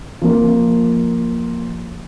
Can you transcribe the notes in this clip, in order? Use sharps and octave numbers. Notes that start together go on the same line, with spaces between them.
F3 A#3